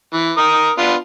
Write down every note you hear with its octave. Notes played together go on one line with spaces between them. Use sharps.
E3
A#4 A#5 D#6
B3 D4 F4